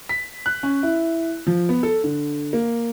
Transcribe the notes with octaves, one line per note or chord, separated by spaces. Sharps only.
B6
F#6
C#4
E4
F3
B3
A4
D3
A#3